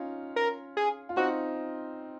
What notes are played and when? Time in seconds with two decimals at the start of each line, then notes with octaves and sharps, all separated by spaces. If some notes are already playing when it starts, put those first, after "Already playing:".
Already playing: C#4 D#4 F4
0.36 A#4
0.77 G#4
1.09 F4
1.16 C4 D#4 F#4